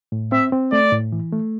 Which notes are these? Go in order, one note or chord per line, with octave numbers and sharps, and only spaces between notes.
A2
C4 E5
C4
A3 D5
A2
E3
A3